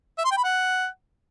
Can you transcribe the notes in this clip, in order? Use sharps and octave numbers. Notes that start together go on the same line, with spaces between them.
E5
C6
G5
B5
F#5